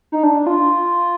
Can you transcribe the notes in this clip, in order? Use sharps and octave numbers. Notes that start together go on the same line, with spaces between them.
D#4
D4
F4